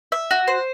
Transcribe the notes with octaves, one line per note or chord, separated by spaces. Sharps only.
E5
F#4
C5